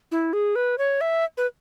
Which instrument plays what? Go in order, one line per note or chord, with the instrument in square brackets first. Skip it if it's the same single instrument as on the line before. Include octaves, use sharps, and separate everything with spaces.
[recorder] E4
G#4
B4
C#5
E5
B4